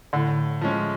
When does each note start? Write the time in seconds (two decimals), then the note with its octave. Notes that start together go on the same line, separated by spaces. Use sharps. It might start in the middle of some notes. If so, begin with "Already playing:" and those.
0.13 A2 D3
0.61 F3 G#3 C#4